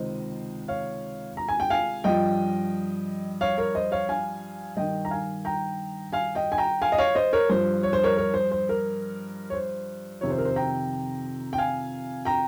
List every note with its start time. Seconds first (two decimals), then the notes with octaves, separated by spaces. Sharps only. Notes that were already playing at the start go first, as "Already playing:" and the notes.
Already playing: C#2 C3 D#3 C5 D#5
0.68 C#5 F5
1.37 A#5
1.48 G#5
1.60 G5
1.70 F5 G#5
2.04 G2 F3 D#5 G5
3.41 C#5 F5
3.58 A#4 C#5
3.75 C5 D#5
3.92 C#5 F5
4.09 F5 G#5
4.77 G2 D#3 D#5 G5
5.05 A#5
5.11 F5 G#5
5.45 G5 A#5
6.13 F5 G#5
6.35 D#5 G5
6.52 G#5
6.58 G5 A#5
6.82 F5 G#5
6.92 D#5
6.98 C#5 F5
7.15 C5 D#5
7.33 A#4 C#5
7.49 G2 F3 C5
7.83 C#5
7.93 C5
8.03 A#4 C#5
8.17 A#4 C#5
8.34 C5
8.51 C5
8.69 A#4
9.50 C#5
9.54 C5
10.21 F2 C3 D#3 C#5
10.30 C5
10.38 A#4
10.45 C5
10.56 G5 A#5
11.53 G5
11.58 F5 G#5
12.25 G5 A#5